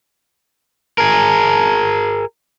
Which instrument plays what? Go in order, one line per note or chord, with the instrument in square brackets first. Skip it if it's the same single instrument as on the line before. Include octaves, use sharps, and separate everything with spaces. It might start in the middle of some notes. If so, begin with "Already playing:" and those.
[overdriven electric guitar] G#4 A#4